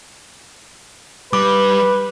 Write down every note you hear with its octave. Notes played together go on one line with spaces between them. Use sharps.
G3 B4 D6